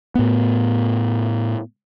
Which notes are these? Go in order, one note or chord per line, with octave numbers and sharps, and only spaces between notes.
A2 B3